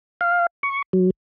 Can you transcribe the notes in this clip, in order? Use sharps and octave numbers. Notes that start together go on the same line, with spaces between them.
F5
C#6
F#3